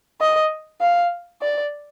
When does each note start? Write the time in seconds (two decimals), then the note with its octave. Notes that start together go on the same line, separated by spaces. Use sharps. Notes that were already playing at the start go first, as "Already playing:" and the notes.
0.21 D#5
0.81 F5
1.42 D5